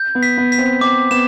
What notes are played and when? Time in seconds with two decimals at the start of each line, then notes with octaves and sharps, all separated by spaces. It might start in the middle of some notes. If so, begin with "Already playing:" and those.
Already playing: G6
0.15 B3
0.23 B6
0.37 B3
0.52 B6
0.59 C4
0.81 C4 D6
1.11 B3 E7